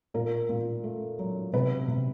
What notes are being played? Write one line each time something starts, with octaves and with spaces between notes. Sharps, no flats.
A#2 A#4
A#2
A3
F#3
C3 B4
C3